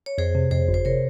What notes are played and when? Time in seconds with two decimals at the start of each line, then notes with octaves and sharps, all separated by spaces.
0.06 C#5
0.18 F2 G#4 C5
0.35 C3
0.51 F2 G#4 C5
0.68 G1
0.74 C5
0.85 C3 A#4 C#5